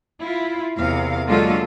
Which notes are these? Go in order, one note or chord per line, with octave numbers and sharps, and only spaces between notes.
E4 F4
E2 C3 A#4 F5
D3 F#3 G#3 A#3 F4 A4